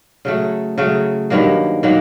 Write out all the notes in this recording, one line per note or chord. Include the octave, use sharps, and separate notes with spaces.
C#3 F#3 A3
C#3 F#3 A3
G2 D#3 F#3 A#3
D#3 F#3 A#3